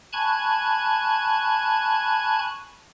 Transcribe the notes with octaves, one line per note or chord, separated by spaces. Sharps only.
G#5 A5 B5 C#6 F#6 G#6